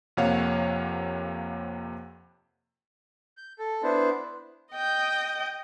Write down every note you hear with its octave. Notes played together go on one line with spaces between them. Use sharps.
F2 C3 A#3 C#5 F5 F#5
G6
A4
B3 D4 E4 C5
D#5 G5